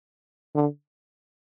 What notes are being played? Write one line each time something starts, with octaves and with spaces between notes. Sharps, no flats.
D3